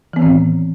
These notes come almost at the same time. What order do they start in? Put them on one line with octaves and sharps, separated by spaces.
E3 B3 D#3 C4 A2